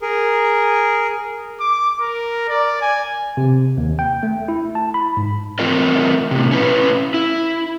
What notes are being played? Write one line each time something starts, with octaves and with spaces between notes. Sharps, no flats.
G#4 A#4
D6
A#4
D5
G#5
C3
D#2
G5
A3
E4
A5
B5
G#2
E3 A3 C4 F4 A#4 D#5
A2 C3
C#4 E4 B4
E4